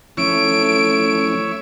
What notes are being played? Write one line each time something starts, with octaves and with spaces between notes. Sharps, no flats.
F3 A3 C#4 E4 C#5 E5 D7